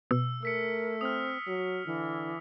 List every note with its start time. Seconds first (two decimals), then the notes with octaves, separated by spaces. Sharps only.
0.11 B2 E6
0.43 A3 A#4 E6 B6 C#7
1.01 C4 D#6 F6
1.47 F#3 F#4
1.86 D3 E3